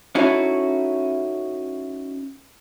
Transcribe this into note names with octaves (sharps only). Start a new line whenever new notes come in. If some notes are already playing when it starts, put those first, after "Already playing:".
C#4 D#4 E4 F#4 A4